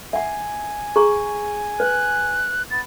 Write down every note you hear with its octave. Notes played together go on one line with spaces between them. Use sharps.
E5 F#5 G#5
G#4 A#5 C#6
B4 F#6
B3 A6